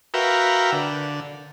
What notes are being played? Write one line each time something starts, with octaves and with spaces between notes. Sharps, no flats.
F#4 A#4 B4 E5 F5 G5
D3